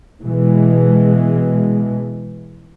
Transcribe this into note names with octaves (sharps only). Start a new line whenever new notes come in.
B2 E3 G#3